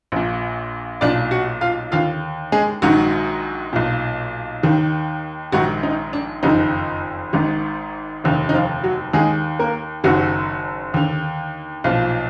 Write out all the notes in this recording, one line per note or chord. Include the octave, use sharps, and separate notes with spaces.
A#1 A#2
B1 A#2 D4 D5
F#4 F#5
F4 F5
D#2 D3 F4 F5
G#3 G#4
A#1 G#2 D#3 F#3 F#4
B1 A#2
D#2 D#3
A#1 G#2 D#3 F#3 F#4
D#4
D4
F#1 F2 D#3 D#4
G#1 G#2 D#3
F1 D#2 D3
D#4
F3 F4
F#3 F#4
D#2 D#3 G#3 G#4
A#3 A#4
F#1 F#2 D#3 F#3 F#4
D#2 D3
B1 A#2 F3 F4